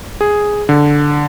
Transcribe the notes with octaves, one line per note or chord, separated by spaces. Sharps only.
G#4
D3